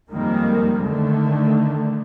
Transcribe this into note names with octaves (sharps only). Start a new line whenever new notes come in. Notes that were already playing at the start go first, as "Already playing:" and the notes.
F2 D#3 G3 G#3 A#3
D3 D#3 A3